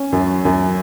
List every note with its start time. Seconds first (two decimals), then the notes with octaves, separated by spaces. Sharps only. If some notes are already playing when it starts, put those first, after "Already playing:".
Already playing: C#4
0.12 F#2
0.45 F#2